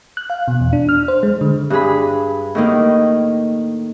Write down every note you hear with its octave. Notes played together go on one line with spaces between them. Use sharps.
F#6
F5
B2
E2
D4
F6
C5
G#3
D3
G2 D4 G#4 B5
A2 D#3 A#3